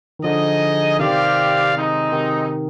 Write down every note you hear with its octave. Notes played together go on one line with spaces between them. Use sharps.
D#3
D3 F3 D#4 G#4 D#5
C3 D#3 C4 G4 D5 F5
G#3 C4 D#4
C3 D#3